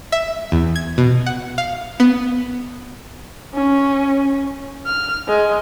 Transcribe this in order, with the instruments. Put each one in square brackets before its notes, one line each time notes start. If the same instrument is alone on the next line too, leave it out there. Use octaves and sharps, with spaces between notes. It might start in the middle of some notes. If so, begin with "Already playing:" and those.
[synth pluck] E5
E2
G#6
B2
F#5
F5
B3
[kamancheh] C#4
F6
G#3